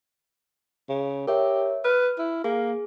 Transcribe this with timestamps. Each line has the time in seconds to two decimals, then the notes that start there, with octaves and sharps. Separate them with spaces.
0.89 C#3
1.27 G4 A#4 C#5 E5
1.85 B4 F6
2.18 E4
2.44 A#3 G#4